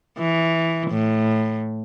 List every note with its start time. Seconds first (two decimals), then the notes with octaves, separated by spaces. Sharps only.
0.18 E3
0.90 A2